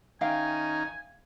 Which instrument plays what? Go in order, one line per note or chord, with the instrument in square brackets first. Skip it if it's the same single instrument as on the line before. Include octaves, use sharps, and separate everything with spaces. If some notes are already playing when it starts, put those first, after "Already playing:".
[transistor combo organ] D#3 C#4 D#4 [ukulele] E5 F5 G5 [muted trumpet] G#5